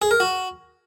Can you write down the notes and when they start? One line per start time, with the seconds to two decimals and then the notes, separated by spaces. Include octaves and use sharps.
0.02 G#4
0.11 A#4
0.20 F#4